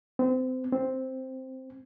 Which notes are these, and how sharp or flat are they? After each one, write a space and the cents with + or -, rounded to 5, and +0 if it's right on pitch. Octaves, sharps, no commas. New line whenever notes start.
C4 -30
C4 +0